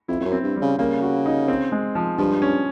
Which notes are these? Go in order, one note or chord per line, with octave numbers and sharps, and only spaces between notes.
F2 E4
F2
F#2
C4
G2
G3
C#3
C#3 A#3
F#4
D#4
C4
G#3
F3
G2 F3
C#4